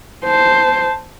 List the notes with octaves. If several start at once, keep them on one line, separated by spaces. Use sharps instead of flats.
C5 A5